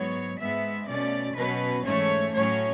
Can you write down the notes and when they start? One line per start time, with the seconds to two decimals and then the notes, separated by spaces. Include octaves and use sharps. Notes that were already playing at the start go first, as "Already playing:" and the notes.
Already playing: G#2 F#3 B3 C#5
0.39 G#2 G#3 B3 E5
0.88 B2 A3 C#4 D5
1.36 B2 F#3 C#4 B4
1.85 G#2 E3 A3 C#4 C#5
2.33 A2 F#3 C#4 C#5